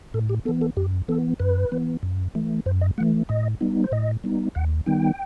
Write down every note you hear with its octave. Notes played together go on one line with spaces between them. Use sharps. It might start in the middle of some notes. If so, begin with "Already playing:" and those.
A2 A4
G4
E3 B3 A4
A4
F#2 G4
E3 B3 A4
F#2 B4
E3 B3
F#2
E3 A3
F#2 C5
D#5
E3 A3 F#5
A2 D#5
G3 B3 D#4
C5
A2 D#5
G3 B3 D#4
D#2 F#5
D#3 G3 B3 D#4 G5